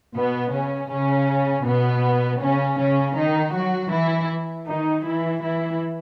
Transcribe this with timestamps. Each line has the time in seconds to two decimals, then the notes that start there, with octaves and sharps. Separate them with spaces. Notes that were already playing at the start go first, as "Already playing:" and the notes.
0.15 B2 B3
0.53 C#3 C#4
0.90 C#3 C#4
1.66 B2 B3
2.41 C#3 C#4
2.79 C#3 C#4
3.16 D#3 D#4
3.54 F#3 F#4
3.92 E3 E4
4.67 D#3 D#4
5.04 E3 E4
5.42 E3 E4